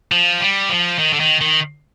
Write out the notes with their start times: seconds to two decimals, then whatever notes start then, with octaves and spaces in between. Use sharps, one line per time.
0.12 F3
0.41 G3
0.69 F3
0.99 D#3
1.13 D3
1.20 D#3
1.41 D#3